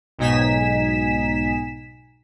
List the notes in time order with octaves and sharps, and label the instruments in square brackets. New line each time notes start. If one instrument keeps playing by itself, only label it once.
[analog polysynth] B1 G#2 D#4 G#5 B6 E7